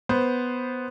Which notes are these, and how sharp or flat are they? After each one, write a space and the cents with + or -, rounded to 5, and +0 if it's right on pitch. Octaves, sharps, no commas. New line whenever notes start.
B3 +0 C5 +0